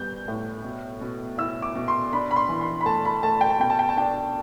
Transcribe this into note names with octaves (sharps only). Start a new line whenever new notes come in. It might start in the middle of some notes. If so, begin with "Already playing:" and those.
Already playing: G3 B3 G6
A2
B2
B2
E4 E6
D6
B2
C6
D4 B5
B5
C6
E3
C6
B5
A3 A5
B5
A3 A5
G5
A5
B2 G5
A5
G5
A5
D4 G5